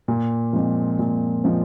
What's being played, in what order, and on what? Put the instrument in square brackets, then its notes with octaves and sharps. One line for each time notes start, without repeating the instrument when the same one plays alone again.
[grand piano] A#2
F3 G#3 C4
A#2
F3 G#3 C4